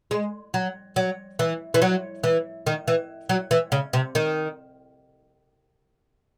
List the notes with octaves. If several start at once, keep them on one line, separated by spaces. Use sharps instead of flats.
G#3
F#3
F#3
E3
E3
F#3
E3
D#3
E3
F#3
E3
C#3
C3
D#3